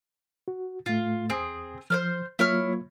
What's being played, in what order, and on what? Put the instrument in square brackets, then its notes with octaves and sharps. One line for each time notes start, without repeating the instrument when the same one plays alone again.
[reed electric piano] F#4
[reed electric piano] A2 A3 [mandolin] F4
[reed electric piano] E2 D#6 [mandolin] C4 G#4
[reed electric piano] F3 [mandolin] C5 D5 F6
[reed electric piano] F#3 A#3 F4 [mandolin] E4 C#5 F6